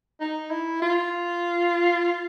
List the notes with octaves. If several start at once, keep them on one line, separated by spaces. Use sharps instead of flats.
D#4
E4
F4